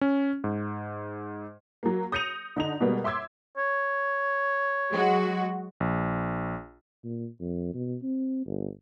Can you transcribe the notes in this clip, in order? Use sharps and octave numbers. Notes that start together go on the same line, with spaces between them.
C#4
G#2
F#3 A#3
D#6 G6 A#6 C#7 D#7 F7
D3 D#4 F7
B2 G3 G#3 A#3 B3
E5 C6 D6 E6 G#6
C#5
F#3 G#3 F#4
A#1
A#2
F2
B2
C4
G1